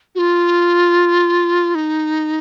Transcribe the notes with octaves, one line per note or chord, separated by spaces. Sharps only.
F#4
F4
D#4